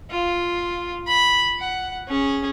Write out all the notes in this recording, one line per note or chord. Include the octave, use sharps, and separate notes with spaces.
F4
B5
F#5
C#4 G#4